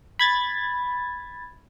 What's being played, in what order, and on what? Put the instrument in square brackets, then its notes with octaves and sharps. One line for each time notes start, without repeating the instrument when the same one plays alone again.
[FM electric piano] B5 G#6 A6